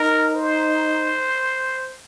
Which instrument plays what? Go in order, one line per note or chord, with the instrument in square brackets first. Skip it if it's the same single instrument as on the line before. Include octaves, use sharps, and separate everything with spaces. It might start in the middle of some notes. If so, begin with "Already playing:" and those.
Already playing: [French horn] D#4 [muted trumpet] A#4
[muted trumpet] C5